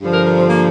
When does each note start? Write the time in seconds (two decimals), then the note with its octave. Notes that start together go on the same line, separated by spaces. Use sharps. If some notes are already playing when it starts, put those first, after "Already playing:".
0.01 G2 D3 F3
0.13 A#4
0.25 A#4
0.36 C4
0.48 A#3